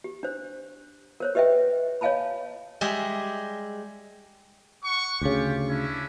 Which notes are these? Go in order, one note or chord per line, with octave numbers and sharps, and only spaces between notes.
G4
D4 C5
A#4 C5 C#5
G4 B4 D#5 E5 G5
C#5 D#5 F5 G#5 A5 B5
G3 G#3 G4 G#4 E5
F#5 C#6
D2 C#3 F4 G4
C#4 D4 E4